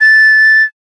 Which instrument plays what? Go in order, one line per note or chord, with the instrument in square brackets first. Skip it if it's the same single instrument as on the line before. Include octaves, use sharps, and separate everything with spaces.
[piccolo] A6